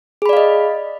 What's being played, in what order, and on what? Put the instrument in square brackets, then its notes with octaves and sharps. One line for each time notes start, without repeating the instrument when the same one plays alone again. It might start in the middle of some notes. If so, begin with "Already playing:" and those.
[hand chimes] G#4
B5
D5
F5
D#5